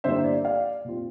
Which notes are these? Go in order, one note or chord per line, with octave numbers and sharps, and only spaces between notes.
G2 D3 G3 A#3 E4 C5 E5
D5
D5 F5
A#2 G3 C4 F4